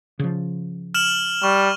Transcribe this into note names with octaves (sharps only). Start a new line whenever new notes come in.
C#3 F3
F6 E7 F#7
G3 C#6